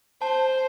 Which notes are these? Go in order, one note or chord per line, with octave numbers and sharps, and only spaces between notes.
C5 A5